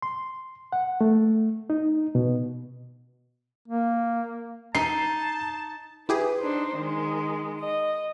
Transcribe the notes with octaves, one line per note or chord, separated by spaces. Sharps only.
C6
F#5
A3
D#4
B2
A#3
D#4 A5 C7
E4 G4 G#4 B4
D4 D#4 C5
D#3 G#3
D#5